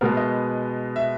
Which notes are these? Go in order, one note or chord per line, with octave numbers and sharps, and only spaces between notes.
B2 G#3 B3 A#4
D#5
E5